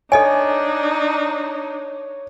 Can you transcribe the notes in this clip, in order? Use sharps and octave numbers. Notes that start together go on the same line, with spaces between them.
D4 D#4 A4 C#5 D#5 G#5